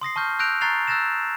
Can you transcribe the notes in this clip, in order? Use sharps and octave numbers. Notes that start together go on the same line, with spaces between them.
C6 D#6 A#6 C7
A5 C#6 F6 G6
E6 F#6 G6 A#6 D7 F7
A#5 C#6 F#6 A6 C7 F7
E6 F#6 G6 A6 A#6 E7